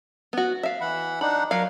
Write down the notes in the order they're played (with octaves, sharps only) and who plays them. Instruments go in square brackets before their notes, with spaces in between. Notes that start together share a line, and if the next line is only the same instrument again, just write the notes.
[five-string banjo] B3 F#4
E5 F5
[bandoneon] E3 F#5 B5
[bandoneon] D4 D#4 F#5 [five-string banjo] B5
[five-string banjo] F#3 F5 [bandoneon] A#4